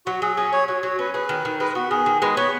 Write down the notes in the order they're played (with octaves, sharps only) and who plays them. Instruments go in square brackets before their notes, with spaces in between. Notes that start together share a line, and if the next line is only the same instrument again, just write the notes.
[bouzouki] F#3 [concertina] F#4
[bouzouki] F#3 [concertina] G#4
[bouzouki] C#4 [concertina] G#4
[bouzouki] G#4 [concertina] C#5
[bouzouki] F#3 [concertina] C#5
[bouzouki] F#3 [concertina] C#5
[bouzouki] C#4 [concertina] B4
[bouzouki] G#4 [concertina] B4
[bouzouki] D#3
D#3
[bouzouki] G#3 [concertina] B4
[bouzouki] B3 [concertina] F#4
[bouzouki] D#3 [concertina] G#4
[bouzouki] D#3
[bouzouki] G#3 [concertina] B4
[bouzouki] B3 [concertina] C#5